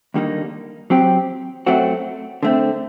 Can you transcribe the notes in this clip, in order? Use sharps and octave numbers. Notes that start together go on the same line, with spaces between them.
D#2 D3 G3 A#3 D#4
F#3 C4 G4
F#2 F#3 A3 C4 F#4
D3 A3 C4